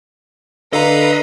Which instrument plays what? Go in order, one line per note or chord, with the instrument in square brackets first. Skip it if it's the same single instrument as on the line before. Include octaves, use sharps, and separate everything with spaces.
[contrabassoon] D3 [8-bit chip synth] A4 F5 A#5 [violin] B4 [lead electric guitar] D#5